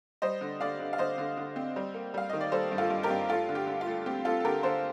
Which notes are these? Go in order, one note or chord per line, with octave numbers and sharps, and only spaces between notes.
G3 C5 D#5
D3
D3 D5 F5
D3
F5
D3 C5 D#5
D3
D3
C4
G3
A#3
G3 F5
D#3 D#5
D5
G3 A4 C5
G2
F4 A4
G2
G4 A#4
G2
A3 F4 A4
D3
G4
D3
F4
A3
C4 G4
C4 F4 A4
A4
D3 G4 A#4
D3 A4 C5